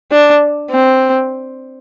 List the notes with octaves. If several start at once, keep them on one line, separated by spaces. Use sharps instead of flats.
D4
C4